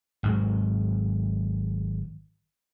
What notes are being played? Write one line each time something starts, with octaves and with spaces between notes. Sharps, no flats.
G#1 G#2 F#3